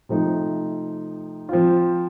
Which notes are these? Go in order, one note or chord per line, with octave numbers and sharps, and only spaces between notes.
C3 F3 A3 D#4
F3 C4 F4